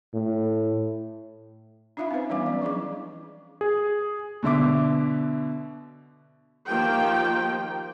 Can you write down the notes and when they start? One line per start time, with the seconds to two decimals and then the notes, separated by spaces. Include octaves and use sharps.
0.14 A2
1.97 D4 D#4 F4 E5 F5 B5
2.11 C4 C#4 D#4 B4 C5
2.29 E3 G3 B3 C#4 F5 D6
2.46 F#3 C#4 D5
2.62 F3 D4 E4 G#4 D#5 D6
3.61 G#4
4.43 B2 D3 E5 D6
6.67 D#3 F3 A#3 G4 G5